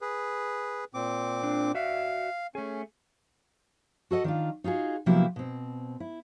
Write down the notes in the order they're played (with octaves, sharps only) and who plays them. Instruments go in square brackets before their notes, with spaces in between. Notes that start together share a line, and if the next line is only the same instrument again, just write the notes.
[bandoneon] G#4 B4
A#2 C4 D6
[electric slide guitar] D4
[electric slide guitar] F#4 D5 E5 [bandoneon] F5
[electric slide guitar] A3 G#4 [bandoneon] C#4
[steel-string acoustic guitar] F#4 A4 D#5 F#5
D#3 D4 F4
D#4 F4 F#4 G#4
C3 F3 F#3 A#3 B3 E4
B2 C4
E4